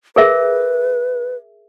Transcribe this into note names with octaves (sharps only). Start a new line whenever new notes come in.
G#4 A#4 B4 E5